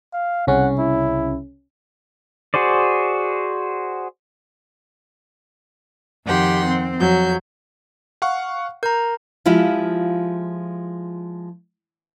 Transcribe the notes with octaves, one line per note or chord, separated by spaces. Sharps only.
F5
C2 C#3 C#4 F#5
E4
F#4 G#4 C5 D5
F2 D#3 G4 F#5 G5 C6
C4
F2 F#3 G6
F5 F#5 C#6
A#4 A#5 G6
F3 G#3 E4 F4 G4